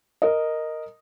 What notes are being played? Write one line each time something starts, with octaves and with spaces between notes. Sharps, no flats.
A#4 D#5